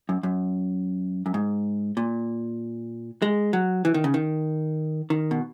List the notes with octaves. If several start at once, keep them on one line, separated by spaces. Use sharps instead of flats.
F#2
F#2
F#2
G#2
A#2
G#3
F#3
E3
D#3
C#3
D#3
D#3
B2